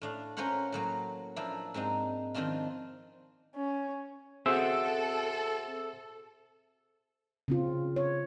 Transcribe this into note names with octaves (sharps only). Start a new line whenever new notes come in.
A2 D4 F5
C#4 F4 A#4 C5 C#5 F#5
A2 F#3 A#3
F3 A#3 D4 E4
G#2 C4 D4 D#4
D#3 F3 C4 D4 F4
C#4
C4 F#4 G#4 A4 C5 E5 E6
C#3 C4 F4
C#5